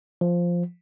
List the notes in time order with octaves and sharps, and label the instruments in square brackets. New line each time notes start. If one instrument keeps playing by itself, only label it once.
[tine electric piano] F3